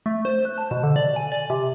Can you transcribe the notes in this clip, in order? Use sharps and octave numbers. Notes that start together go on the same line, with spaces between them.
A3
C5
F#6
A5
B2
D3
D5
G#5
D5
C3